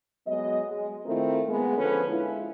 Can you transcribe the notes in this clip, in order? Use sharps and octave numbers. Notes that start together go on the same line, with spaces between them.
F#3 G#3 B3 D#5
G#3
D#3 A3 C4 E4 F4 A#4
G#3 A#3 B3
D3 F3 C#4 A4 B4
G#3 E4 F4